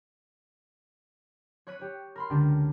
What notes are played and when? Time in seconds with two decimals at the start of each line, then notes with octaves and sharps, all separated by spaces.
1.67 C#5 C#6 F#6 B6 D#7
1.79 G4 C#5
2.16 A#4 B5 C6
2.30 C#2 D3 D4 G4